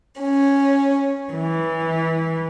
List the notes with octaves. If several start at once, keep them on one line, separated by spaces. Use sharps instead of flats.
C#4
E3